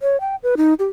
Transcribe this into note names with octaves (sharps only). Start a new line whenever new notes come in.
C#5
G5
B4
D#4
G4